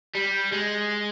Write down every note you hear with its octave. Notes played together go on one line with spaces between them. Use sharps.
G3
G#3